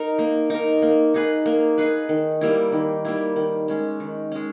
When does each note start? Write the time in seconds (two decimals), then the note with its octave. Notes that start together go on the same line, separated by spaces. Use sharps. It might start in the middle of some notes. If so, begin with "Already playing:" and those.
Already playing: D#4 A#4
0.19 A#3
0.50 D#4 A#4
0.82 A#3
1.14 D#4 G#4 B4
1.46 A#3
1.78 D#4 G#4 B4
2.09 D#3
2.41 G3 A#3 E4
2.72 D#3
3.05 G3 A#3 E4
3.36 D#3
3.68 G#3 C#4
4.00 D#3
4.32 G#3 C#4